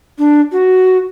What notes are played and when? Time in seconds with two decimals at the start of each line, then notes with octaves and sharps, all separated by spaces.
0.18 D4
0.52 F#4